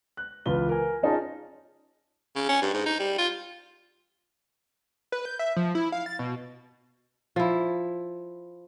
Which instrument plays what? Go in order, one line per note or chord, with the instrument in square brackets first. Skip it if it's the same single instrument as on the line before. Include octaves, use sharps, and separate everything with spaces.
[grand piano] F#6
C#2 E3 F4 B4 G7
A#4 G#5
C#4 D#4 F4 G#4 A5
[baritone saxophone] C#3
C#4
G2
G#2
D#4
G3
F4
[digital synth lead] B4
G6
E5
F3
E4
F5
A6
B2
[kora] F3 E4